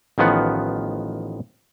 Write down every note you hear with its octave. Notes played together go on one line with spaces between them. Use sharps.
A1 D#3 F3 B3 F#5